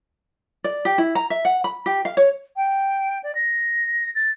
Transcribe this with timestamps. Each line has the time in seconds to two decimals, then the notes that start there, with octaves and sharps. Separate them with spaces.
0.64 D5
0.85 G4
0.98 E4
1.15 A#5
1.30 E5
1.45 F#5
1.64 B5
1.86 G4
2.05 F5
2.17 C#5
2.56 G5
3.23 D5
3.35 A#6
4.15 A6